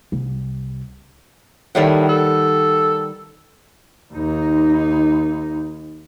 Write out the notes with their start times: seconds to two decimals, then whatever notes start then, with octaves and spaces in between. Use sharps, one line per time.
0.12 C2
1.75 A2 D#3 G3 F#5
2.09 A4
4.14 D#2 D#4